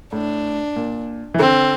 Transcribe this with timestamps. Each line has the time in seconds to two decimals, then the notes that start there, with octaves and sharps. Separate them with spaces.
0.12 A2 D4
0.76 A#2
1.34 E3
1.39 D3 C4